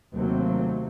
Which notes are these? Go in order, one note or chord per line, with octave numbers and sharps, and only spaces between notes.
D#2 C3 F#3 A3 A#3 C4